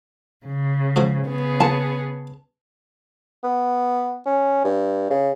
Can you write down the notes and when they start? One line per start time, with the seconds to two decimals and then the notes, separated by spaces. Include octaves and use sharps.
0.46 C#3
0.96 G#2 F3 F#4
1.26 C#3 B3 G#4
1.60 A#3 C#4 A5
3.44 B3
4.26 C#4
4.64 G2
5.10 C#3